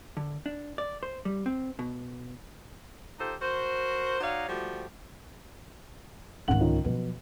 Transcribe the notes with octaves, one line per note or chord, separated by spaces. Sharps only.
D3
D4
D5
C5
G3
C4
B2
D#4 F4 G4 A4 C5
F#4 A#4 C5
D#4 F#4 C#5 D5 F5
F3 G3 A3 F#4 G4
G#1 C#2 G#2 F#5 F#7
D#3 F3 C#4
B2 F3 F#3